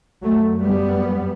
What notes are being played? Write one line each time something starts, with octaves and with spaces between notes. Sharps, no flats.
F#2 F#3 A3
G3 B3